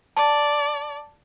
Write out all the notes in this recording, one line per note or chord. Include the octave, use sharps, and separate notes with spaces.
D5 A5